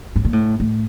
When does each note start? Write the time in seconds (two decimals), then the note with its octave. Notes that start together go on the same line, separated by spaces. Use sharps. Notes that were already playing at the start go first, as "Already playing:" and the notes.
0.16 A2
0.25 A#2
0.33 A2
0.60 A2